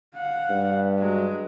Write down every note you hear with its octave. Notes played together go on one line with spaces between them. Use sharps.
F5 F#5
G2
F#3 G#3